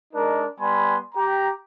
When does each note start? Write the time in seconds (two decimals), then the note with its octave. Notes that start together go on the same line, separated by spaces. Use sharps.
0.13 G#3 D4 D#4 A#4
0.59 G3 B3 G#5 B5 C6
1.15 G4 A#5